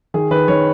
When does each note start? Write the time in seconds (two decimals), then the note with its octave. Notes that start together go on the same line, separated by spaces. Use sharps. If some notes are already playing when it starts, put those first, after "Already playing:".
0.14 D#3 G#4
0.31 D#3 B4
0.48 D#3 C#5